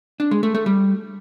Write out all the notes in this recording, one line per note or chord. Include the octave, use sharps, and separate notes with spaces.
D4
G#3
A3
A3
G3